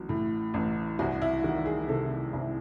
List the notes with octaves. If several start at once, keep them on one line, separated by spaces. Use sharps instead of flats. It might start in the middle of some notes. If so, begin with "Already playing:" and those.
Already playing: A1 F#3
A2
A1
C2 F#4
E4
D#3 F#4
G#4
C3 A4
C2